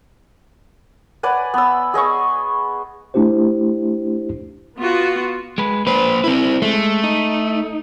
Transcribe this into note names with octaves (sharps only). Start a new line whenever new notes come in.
B4 D5 F#5 G#5
B3 E6
G#4 D#5 B5 C#6
A3 D4 E4 G4 C5
B3 F4 F#4
G#3 B4
A#3 B4 C5
C4 E4
G#3 A3
D#4